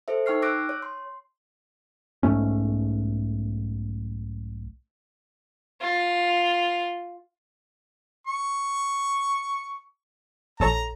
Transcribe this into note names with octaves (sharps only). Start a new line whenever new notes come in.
A4 C5 E5
D#4 G5 C#6 F6 C7
D6 E6 F#6 A#6 D7
C#5
C6
B1 G#2 A3 C#4
F4
C#6
A#1 A4 C#5 A#5